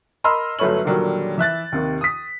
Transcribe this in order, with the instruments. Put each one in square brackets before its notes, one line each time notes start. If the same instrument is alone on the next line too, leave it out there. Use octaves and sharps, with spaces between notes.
[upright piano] A#4 D#5 B5 C6 E6 F6
G1 F#3 A3 B4 C#5 F#7
A#2 D3 D#3 F#3 G3 A#3
E3 E5 F#6 A6
D#2 C3 D#3
D#6 B6